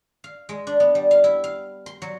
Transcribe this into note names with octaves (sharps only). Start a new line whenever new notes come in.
F5
G#3
D4
B3
G3
F5
E4
F5
C6
F#3